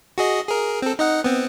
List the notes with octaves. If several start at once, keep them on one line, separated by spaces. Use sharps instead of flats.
F#4 G#4 D#5
G#4 A#4
C4 A4
D#4 D#5 F#5
B3 C4